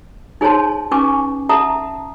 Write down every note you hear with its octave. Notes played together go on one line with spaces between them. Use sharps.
D#4 G#4 C5 C#5 A5 C6
C#4 D#4 B4 G#5 C#6 D6
E5 F#5 A5 A#5 D#6